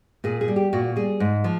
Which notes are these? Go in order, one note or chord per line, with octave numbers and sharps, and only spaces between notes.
A#2 G#4
G#4
G3
G4
A#2 F#4
G3 G#4
G#2
F3